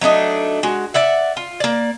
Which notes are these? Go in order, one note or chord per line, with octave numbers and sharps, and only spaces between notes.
F#3 A3 D4 D#4
G#3 F#4
D5 E5 F#5
F4
A#3 D5